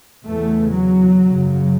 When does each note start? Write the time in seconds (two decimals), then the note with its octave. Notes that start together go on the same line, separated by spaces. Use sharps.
0.25 E2 C#3 A3
0.74 F#3
1.23 F#2 C#3